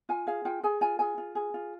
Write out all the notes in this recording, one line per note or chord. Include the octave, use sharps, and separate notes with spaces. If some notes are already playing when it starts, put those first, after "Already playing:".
F4 G#5
G#4 F5
F4 G5
G#4 G#5
F4 G#5
G#4 G#5
F4
G#4
F4